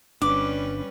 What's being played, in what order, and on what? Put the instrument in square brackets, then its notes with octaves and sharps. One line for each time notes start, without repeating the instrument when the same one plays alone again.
[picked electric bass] G1 D4 [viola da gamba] G3 C#4 B4 [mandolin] D6